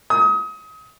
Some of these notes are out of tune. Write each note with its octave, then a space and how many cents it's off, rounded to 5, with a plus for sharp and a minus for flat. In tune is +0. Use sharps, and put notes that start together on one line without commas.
D#6 +30